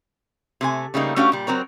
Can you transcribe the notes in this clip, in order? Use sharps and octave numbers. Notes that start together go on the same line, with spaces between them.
C3 A3 G#5
C#3 G3 A3 A#3 D#4
A3 C#4 D4 F#4 G4 F5
A#2 G3
F#3 C4 A#4 C#5